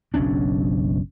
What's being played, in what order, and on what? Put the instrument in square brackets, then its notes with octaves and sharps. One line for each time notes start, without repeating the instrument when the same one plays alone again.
[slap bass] F#1 B1 C#4 D4